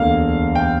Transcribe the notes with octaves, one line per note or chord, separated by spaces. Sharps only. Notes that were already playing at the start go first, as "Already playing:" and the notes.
Already playing: E1 D2 D3 G3 A#3 F5
G5